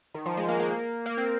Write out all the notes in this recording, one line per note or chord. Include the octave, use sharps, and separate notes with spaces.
D#3
F3
G#3
A#3
A#3
A#3
C4